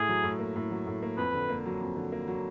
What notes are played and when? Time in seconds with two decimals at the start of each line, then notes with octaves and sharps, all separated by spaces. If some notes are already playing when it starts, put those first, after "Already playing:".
Already playing: A2 G#4
0.08 F#3
0.24 A2
0.39 A#3
0.56 A2
0.71 F#3
0.86 A2
1.02 A#3
1.17 F2 B4
1.34 D3
1.49 A#3
1.66 F#3
1.81 F2
1.96 D3
2.12 A#3
2.28 F#3